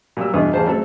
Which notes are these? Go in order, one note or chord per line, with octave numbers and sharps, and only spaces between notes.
A#2 F#3 G3 E6
E2 G2 B2 D#6
A1 E2 C#3 G#4 C5 A5
F#3 A3 C4 G#4 A4